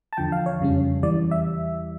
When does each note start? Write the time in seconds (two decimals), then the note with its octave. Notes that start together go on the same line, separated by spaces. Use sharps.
0.13 A5
0.17 E2 D3 F3 G5
0.32 F5
0.46 C#5
0.60 F2 C#3 G3 C#4
1.03 E2 E3 G3 D5
1.31 E5